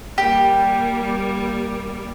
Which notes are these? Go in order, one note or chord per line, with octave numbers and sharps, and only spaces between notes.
G3 A#3 G4